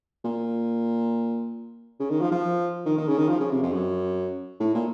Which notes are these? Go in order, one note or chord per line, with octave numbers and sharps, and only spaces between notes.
A#2
C#3
D#3
F3
F3
D#3
D#3
C#3
D#3
F3
C#3
C3
F2
F#2
A2
A#2